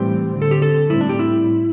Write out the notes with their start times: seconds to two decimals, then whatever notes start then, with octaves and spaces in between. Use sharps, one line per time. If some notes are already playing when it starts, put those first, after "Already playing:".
Already playing: A2 E3 G3 C4 G4
0.32 D3 C4
0.42 A4
0.51 G4
0.62 A4
0.90 A2 G3 C4 E4
1.01 D4
1.09 G4
1.19 E4